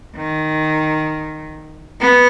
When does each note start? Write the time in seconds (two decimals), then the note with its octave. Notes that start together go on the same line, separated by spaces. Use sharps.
0.14 D#3
1.99 B3